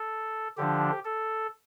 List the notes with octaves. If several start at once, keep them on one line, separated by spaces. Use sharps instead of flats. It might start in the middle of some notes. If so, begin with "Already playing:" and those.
Already playing: A4
D3 F3 D4 G4
A4